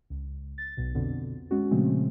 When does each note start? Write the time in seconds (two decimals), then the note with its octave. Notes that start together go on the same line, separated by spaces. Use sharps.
0.10 C#2
0.58 A6
0.77 B1 B2
0.95 F2 B2 D3
1.51 G#3 C#4 F#4
1.71 A#2 C#3 F3 G#3 A3 C4